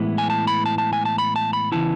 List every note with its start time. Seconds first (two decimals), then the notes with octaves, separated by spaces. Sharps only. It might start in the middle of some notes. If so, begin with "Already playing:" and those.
Already playing: A2 E3 G#3 B3 E4
0.18 G#5
0.30 A5
0.47 B5
0.66 A5
0.78 A5
0.93 G#5
1.05 A5
1.18 B5
1.36 A5
1.53 B5
1.72 C#3 E3 B3 E4 A5